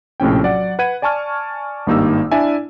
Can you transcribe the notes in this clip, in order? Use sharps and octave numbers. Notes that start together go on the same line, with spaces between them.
A#1 A2 C3 C#4 G5
F#3 D5 F#5
B4 F#5 G#6 D#7
D5 G#5 A5 C#6 F6
G#1 G2 A#3 D#4 G4 E6
D4 E4 D5 E5 G#5